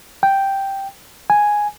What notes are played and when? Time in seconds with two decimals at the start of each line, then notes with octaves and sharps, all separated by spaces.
0.23 G5
1.30 G#5